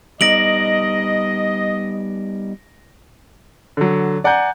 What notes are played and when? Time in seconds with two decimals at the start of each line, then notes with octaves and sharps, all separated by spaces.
0.21 G3 B3 D#4 D#5 A#6 D7 F#7
3.77 D3 F#3
4.24 D5 F#5 G#5 A#5 G6